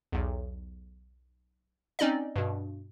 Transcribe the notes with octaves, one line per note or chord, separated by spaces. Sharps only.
B1 E2
C4 C#4 D#4 D5 D#5
G2 B2